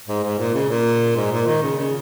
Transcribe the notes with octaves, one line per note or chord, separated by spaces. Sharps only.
G#2
G#2
A#2
C#3
A#2
G#2
A#2
D#3
C#3
C#3